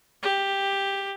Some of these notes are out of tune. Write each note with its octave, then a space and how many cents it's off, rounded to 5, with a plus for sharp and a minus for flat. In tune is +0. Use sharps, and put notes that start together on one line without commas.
G4 +10